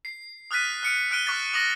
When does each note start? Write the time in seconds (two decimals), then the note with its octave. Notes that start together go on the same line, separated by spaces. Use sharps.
0.05 C7
0.51 D#6 F6 F#6 A6 B6 D#7
0.83 F6 C#7 D7
1.11 F6 F#6 D7 D#7 G7
1.26 C#6 D6 F6 F#6 A6 B6
1.53 D6 D#6 A6 A#6 F#7